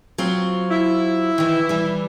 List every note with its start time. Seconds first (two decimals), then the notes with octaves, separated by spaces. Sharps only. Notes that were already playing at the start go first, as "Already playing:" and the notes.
0.18 F#3 C4 F4
0.71 E4
1.38 D#3 E3
1.69 E3 G3